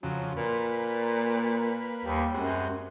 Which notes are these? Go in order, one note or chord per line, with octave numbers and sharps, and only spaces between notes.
F2 C#3 F#3
A#2 A#3 B4
D#2 G3
F#2 G#3 C4 F#4